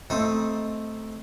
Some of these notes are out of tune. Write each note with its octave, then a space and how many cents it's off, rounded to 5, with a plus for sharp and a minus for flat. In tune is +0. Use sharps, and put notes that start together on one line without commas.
A3 +0 C4 +0 D#4 +15